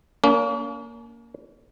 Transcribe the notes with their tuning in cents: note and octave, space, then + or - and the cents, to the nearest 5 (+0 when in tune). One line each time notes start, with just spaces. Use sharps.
A#3 +0 C#4 +40